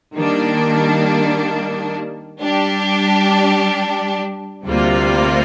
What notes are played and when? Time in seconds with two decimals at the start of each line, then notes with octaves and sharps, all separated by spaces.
0.15 D#3 G3 A#3 D4
2.40 G3 D4 G4
4.65 D2 C3 G3 A#3 F4